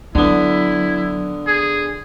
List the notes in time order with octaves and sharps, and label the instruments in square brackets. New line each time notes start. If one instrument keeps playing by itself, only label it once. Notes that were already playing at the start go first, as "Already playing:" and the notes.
[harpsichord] D3 B3 [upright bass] F#3 [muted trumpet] E4
[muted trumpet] G#4